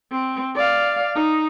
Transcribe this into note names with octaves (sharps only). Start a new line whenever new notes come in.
C4
D5 F5
D#4